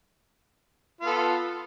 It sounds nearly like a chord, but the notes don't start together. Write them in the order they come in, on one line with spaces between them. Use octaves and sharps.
F4 B3 A4